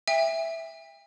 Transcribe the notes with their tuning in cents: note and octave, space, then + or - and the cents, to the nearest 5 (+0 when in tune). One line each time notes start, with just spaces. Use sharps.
E5 +0 G5 +40